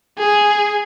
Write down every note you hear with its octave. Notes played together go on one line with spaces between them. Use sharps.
G#4